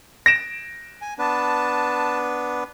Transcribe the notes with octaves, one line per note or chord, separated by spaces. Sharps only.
A#6 D7 E7
G#5
B3 D4 B4 A5